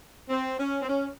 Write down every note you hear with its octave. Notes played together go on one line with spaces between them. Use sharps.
C4
C#4
C4
C#4